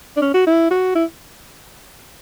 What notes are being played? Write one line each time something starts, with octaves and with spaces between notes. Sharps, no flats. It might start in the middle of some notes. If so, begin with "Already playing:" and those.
D4
C#4
F#4
E4
F#4
E4